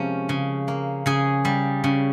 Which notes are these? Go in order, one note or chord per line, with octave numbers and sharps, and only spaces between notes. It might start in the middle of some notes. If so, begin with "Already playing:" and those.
Already playing: C3 F3 G#3 C#4 A#4
C#3
A#3
C#3 G#4
G3
C#3